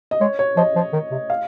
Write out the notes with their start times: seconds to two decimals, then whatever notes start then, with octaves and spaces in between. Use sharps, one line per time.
0.11 D#5
0.21 G#3 C#5
0.39 C#5
0.57 F3 D#5
0.76 F3
0.93 D#3
1.11 C3
1.30 F5